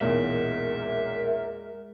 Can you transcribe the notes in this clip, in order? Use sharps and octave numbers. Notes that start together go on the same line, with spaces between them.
B1 E2 A#2 G#3 A#4 E5